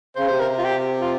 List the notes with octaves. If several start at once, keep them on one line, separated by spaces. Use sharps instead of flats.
C#3 C5
C3 C5
A#4
F4
G4
F4